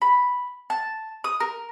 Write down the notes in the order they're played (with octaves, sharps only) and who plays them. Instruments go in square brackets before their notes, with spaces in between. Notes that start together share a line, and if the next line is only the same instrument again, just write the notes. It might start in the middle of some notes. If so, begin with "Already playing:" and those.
[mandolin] B5
A5
D#6
A#4